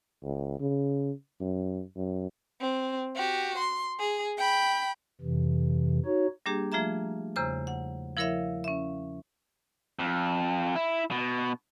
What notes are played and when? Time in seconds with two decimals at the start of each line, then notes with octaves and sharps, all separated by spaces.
0.24 C#2
0.60 C#3
1.41 F#2
1.97 F#2
2.61 C4
3.16 F#4 G4
3.58 C6
4.00 G#4
4.37 G5 B5
5.21 F2 C3 E3
6.05 D#4 F#4 C#5
6.46 G3 A#3 D4 G4 G#4
6.72 F3 A3 F4 G#4 E5 A#5
7.36 E2 C#3 C5 A#5 E6
7.67 F#5
8.17 F3 E4 A#4 C#5 E5 F5
8.64 C#4 E5
9.99 F2
10.75 E4
11.11 B2